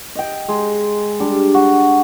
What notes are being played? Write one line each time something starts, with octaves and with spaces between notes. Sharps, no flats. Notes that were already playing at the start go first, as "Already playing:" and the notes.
D#5 G5
G#3
G3 D4
F#4